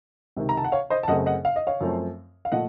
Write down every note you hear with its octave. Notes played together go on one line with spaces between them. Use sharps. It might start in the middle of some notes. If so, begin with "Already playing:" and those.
C#2 C3 D#3
A#5
A5
F#5
C#5 F5
C5 D#5
A5
F#2 C#3 A3 C4 D#5 F#5
D#5 F#5
F5
D#5
C#5 F5
F#2 F3 A3 C4
F5
A#2 F3 A3 D#5 F#5